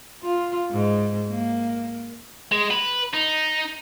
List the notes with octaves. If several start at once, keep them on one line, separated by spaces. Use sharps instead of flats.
F4
G#2
A#3
G#3
B4
D#4